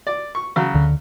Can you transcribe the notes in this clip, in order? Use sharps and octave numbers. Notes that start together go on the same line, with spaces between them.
D5
C#6
C#3 F#3
D2 D3